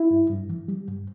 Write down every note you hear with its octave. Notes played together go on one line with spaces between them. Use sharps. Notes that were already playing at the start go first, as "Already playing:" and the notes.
Already playing: E4
G2
G2
E3
G3
G2